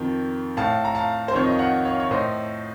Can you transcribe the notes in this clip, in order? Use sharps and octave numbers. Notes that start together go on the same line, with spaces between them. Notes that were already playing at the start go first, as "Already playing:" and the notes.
Already playing: F2 D#3
A2 F5 A5
A#5
F5 A5
C5
F2 D#3 C#5
D#5
F5
D#5 F#5
C#5 F5
C#5
A2 C5 D#5